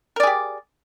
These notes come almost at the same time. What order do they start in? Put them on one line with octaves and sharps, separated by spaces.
A#4 D5 G#4 G4